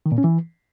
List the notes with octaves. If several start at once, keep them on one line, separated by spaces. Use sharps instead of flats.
D#3
A#2
C#4
E3